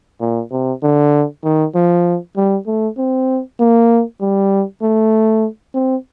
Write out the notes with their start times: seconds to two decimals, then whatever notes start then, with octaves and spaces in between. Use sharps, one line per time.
0.20 A#2
0.51 C3
0.82 D3
1.44 D#3
1.75 F3
2.36 G3
2.67 A3
2.97 C4
3.60 A#3
4.21 G3
4.82 A3
5.74 C4